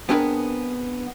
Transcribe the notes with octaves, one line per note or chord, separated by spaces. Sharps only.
B3 C4 D4 G#4 A#4 B4